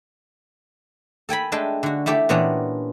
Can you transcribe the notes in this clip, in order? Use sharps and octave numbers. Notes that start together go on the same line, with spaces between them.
A4 G5 G#5 B5
G#3 A3 D4 A4 G5 G#5
D3 F#4
A3 E4 G4 A4 D5
A#2 E3 B3 C#4 D4 A#5